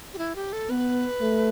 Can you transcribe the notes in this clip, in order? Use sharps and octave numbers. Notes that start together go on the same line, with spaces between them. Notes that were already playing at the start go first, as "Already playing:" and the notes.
G4
E4
G4
A4
B3 B4
A3